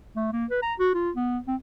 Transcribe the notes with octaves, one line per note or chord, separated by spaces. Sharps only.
A3
A#3
B4
A#5
F#4
F4
B3
C4